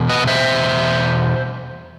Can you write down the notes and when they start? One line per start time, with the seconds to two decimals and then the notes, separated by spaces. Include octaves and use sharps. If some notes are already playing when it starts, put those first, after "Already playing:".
Already playing: E2 B2
0.09 B4 D#5
0.27 C5 E5